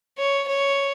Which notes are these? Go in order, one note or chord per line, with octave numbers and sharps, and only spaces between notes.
C#5
C#5